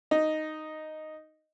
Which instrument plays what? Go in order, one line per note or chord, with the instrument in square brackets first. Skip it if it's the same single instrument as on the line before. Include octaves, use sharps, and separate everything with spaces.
[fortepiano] D#4